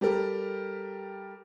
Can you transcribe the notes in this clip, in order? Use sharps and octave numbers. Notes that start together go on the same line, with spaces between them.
G3 G4 A4 A#4